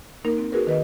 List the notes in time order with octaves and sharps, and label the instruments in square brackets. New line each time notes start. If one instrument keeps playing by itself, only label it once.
[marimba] A#3 D#4 A#4
C4
F#4 G#4 A#4 B4
D#3 B4 D#5